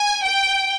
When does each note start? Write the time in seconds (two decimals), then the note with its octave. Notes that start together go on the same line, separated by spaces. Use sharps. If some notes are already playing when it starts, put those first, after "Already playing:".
Already playing: G#5
0.24 G5